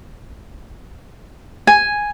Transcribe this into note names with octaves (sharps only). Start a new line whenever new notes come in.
G#5